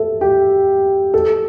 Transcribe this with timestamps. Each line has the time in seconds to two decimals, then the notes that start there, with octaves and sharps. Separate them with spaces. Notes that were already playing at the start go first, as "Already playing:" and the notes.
Already playing: A4 E5
0.21 G4
1.14 A4